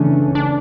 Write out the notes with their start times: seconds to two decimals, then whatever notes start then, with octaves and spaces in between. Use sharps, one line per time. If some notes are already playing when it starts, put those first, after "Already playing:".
Already playing: C#3 E3 A3 C#4 D4
0.35 D4